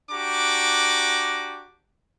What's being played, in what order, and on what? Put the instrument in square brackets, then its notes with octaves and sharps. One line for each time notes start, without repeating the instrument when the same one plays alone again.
[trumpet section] D4 F#4 G4 A#5 D6